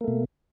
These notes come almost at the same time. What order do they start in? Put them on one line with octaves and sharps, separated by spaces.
A#3 A3 B2